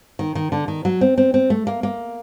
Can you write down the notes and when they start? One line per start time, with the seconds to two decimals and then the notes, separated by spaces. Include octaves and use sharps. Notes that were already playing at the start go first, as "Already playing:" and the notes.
0.19 D#3
0.35 D#3
0.52 D3
0.68 D#3
0.85 F#3
1.01 C4
1.18 C4
1.34 C4
1.50 A3
1.67 A#3
1.83 A#3